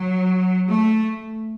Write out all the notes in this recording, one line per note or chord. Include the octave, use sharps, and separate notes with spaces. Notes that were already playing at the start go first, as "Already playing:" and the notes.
Already playing: F#3
A3